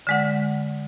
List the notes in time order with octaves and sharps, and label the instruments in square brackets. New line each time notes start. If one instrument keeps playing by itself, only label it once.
[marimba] D3 G#3 F#5